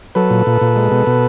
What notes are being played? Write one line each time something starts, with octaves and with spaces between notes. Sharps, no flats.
F#3 A4 B4
A#2
A#2
A#2
G#3
B2
B2